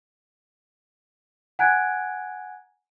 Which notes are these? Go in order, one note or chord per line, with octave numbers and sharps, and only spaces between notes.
F#5 G#5 A#5 F#6 G#6 D7